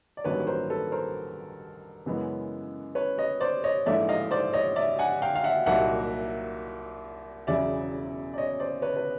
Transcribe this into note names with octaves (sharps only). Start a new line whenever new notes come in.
D5
A1 G2 D#3 F#3 A#3 B4 C#5
A#4 C5
A4 B4
A#4 C5
F#2 C#3 E3 G#3 B3
B4 C#5
C#5 D#5
C5 D5
C#5 D#5
A#1 G#2 E3 A3 D5 E5
D#5 F5
C5 D5
C#5 D#5
D5 E5
F#5 G#5
F5 G5
F5
E5 F#5
C2 A#2 F#3 A#3 D#4 E5 F#5
E1 E2 C#3 F#3 D5 E5
D5
C#5 D#5
C5 D5
B4 C#5
B4